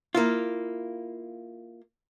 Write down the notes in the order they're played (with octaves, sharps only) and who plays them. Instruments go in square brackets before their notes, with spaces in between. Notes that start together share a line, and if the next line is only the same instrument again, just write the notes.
[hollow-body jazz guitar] A#3 E4 F4